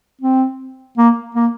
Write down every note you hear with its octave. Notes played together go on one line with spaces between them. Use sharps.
C4
A#3
A#3